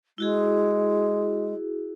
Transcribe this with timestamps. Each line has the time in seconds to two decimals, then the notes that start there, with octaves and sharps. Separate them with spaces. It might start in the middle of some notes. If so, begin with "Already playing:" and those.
0.18 G#3 E4 F#4 G#4